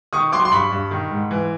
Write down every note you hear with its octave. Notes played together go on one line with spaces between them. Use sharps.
D#3 C#6 D#6
F#3 C6 D6
C6
G2 B5 C#6
G2
D#3
G#2
E3